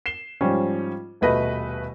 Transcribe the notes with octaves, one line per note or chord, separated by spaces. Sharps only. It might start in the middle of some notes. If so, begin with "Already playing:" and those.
C7 E7 G7
G#2 F3 G3 C#4
D#1 B2 A3 B4 D#5 A#6